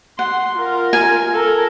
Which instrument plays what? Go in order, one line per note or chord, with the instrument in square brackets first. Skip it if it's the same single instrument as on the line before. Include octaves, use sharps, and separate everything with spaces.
[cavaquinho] F#5 [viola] C6
[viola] F4 A#4
[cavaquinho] G#5
[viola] A4 A#4